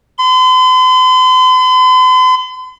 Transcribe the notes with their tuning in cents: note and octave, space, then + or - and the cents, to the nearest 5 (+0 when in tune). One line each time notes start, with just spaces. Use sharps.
C6 -45